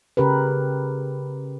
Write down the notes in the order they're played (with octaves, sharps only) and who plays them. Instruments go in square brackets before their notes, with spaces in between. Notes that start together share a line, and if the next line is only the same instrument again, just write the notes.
[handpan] C#3 G4 A#4 B4